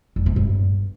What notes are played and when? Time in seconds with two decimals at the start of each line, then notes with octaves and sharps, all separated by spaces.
0.16 E2
0.26 E3
0.36 G2